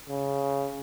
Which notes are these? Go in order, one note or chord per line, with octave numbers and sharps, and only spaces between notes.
C#3